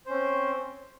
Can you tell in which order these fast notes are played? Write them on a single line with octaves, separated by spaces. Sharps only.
C5 C#4 C4